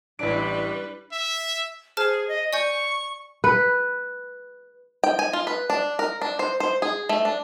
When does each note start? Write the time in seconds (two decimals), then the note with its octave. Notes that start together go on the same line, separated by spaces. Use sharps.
0.19 A1 G3 D4 E4 B4 D5 D7
1.12 E5
1.97 G#4 C5 A5 F6
2.29 D#5
2.53 D5 G#5 C#6 G6
3.44 B4
5.04 G5
5.19 G#5
5.33 F4
5.47 B4
5.70 D4
5.99 A#4
6.22 D4
6.39 C5
6.60 C5
6.82 G#4
7.09 A3
7.25 D4